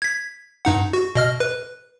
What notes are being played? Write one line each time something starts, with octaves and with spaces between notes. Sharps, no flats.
G#6 B6
G2 D#4 F#5
F#4
B2 D#5 F6
B4